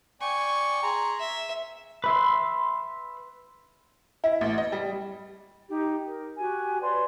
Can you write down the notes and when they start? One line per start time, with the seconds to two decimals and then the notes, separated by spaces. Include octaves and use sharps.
0.21 D5 G5 G#5 C#6
0.83 G#4 A#5 C6
1.20 E5
2.04 B4 E5 C6
4.24 E4
4.41 A1
4.58 D#5
4.72 G3
5.69 D#4 G4
6.06 A#4
6.39 F#4 G4 G#5
6.82 B4 C#5 D5 C6